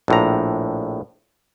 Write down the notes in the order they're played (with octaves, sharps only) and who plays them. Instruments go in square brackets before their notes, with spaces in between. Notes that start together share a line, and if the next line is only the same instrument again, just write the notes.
[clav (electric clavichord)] A#1 A2 A#5